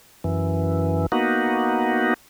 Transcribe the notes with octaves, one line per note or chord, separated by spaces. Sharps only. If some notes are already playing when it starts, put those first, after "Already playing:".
F#2 E3
A#3 B3 D#4 F#4